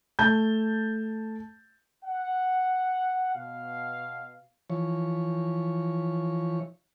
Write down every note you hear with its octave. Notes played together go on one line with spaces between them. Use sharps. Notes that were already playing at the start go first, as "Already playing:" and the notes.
A3 A5 G6
F#5
B2 F5
E3 F3 C#5